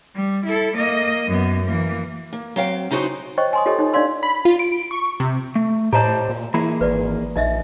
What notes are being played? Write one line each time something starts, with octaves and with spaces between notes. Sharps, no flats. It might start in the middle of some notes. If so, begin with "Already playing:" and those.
G3
E4 A4
A#3 D#5
F#2 B3
E3 A#3
A#3
F#3 C4 F5 G5
C#3 D#4 E4 F#4 G#4 C5
C5 C#5 D#5 G5 C#6
G#5 C6 D#6
F4 G4 A4 C#5 D#5
D#4 C#5
D4 C#5 D5 F5 C6 E6
B5
F4
D7
C#6
C3
A3
A2 G4 C5 C#5 D#5 A5 A#5
A#2
E3 A#3 E4 G#4 B5
G#1 B4 D5
A#1 D#4 D#5 E5